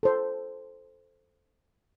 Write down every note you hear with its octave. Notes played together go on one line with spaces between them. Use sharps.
A4 C5